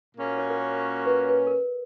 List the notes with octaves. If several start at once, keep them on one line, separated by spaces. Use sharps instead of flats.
A#2 A#3 C#4 F#4
C#5
A#4
B4
B4
A#4
B4